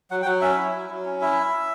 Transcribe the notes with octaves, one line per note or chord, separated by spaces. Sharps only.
F#3 F#5
G5
F#3 F#5
C#4 E5
E4
F#3
F#3
C#4
E4 E5